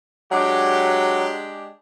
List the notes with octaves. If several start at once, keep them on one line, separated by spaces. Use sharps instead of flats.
F#3 G#3 D4 G4